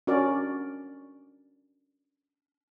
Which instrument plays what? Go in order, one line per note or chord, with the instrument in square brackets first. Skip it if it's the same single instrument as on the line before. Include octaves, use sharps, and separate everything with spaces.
[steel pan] C#4 D4 F#4 A#4 D5